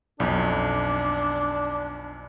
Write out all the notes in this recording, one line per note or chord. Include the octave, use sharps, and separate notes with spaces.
B1 F2 D4